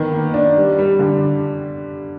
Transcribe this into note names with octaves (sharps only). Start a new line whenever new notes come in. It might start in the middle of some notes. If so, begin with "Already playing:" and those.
Already playing: D#3 B3
A#3
D4
G3
G3
D3